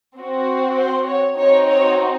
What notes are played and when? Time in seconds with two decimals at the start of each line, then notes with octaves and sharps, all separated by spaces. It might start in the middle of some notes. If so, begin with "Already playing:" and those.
0.17 C4 F#4
0.77 C5
1.07 C#5
1.37 C4 D#4 F#4 C#5
1.67 C#5